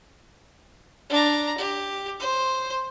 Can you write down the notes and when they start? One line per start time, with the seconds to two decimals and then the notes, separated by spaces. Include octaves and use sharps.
1.10 D4 A#5
1.58 G4
2.19 C5